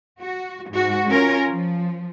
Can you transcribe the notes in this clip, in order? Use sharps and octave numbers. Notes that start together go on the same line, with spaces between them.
F#4
G#2 F#4
C#4 F4 A#4
F3